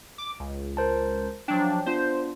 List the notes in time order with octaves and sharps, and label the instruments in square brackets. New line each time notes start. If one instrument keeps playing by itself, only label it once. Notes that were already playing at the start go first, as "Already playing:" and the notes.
[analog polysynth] D6
C#2
[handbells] A#4 C5 A5
[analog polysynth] F3 F#3 D4 [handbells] G5
[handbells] B3 D4 F4 [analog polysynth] C5